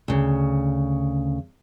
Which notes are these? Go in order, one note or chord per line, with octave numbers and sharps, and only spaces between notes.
D2 C#3